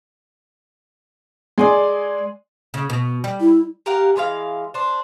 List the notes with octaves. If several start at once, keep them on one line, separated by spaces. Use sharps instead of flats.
G#3 D5 G#5 C6
C#3
B2
G3
E4
G4 A#4 F5 F#5
E3 G#3 C#5 F5
D4 C5